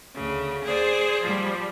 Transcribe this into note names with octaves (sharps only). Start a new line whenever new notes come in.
D2 C#3
G#4 C5 D5
F3 G3